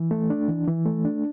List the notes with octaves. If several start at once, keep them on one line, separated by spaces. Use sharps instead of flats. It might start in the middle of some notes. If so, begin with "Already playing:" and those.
Already playing: E3
A3
D4
E3
E3
A3
D4